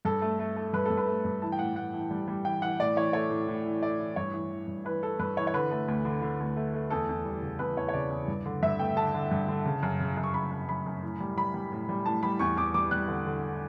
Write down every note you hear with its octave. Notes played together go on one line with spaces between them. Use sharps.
G2 A4
A3
A3
A3
G2 B4
G2 A4
B4
A3
G2
E3 A5
G5
A2 F#5
A2 F#5
E3
G3
G3
E3 G5
E3 F#5
A2 D5
E3 C#5
A3 C#5
A2
A2
E3
A3 D5
E3
G2 C#5
E3
E3
G2
E3 B4
E3 A4
G2 B4
E3 C#5
C#5
D3 B4
A3
D2
D3
D3
D2
A3
A3
E2 A4
E2
G3
C#3
E2 B4
E2 C#5
C#5
C#3 D5
E2
G2
D3
G2 E5
A3 G5
D3 A5
D3
G2
D3
C#3
F#2
C#3
F#2
C#6
F#2 B5
F#2
F#2 B5
F#2
A2
G3
G3 B5
G3
A2
G3
A2 A5
G3 B5
E2 C#6
E2 D6
G3 D6
G3 F#6
D3
D3